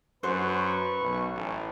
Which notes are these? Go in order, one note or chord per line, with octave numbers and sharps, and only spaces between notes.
F#2 F#4 B4 C5 C#6
B1
A1